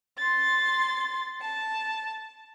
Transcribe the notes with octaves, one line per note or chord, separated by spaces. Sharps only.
C6 A6
A5